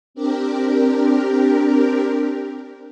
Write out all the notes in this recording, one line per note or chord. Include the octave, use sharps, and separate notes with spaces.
C4 D4 G4 A#4